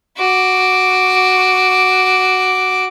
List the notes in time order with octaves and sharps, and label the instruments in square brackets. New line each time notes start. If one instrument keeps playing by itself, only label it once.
[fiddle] F#4 D6